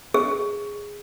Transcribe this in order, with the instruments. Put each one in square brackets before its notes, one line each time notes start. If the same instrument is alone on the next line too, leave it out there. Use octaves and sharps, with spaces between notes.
[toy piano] G#4